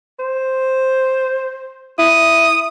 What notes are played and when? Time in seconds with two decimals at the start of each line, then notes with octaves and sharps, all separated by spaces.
0.19 C5
1.99 E4 D#6